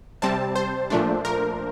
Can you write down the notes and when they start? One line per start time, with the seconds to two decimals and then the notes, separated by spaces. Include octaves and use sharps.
0.22 C3 G3 C4 A5
0.56 C5
0.90 A#2 F3 A3 D4
1.25 A#4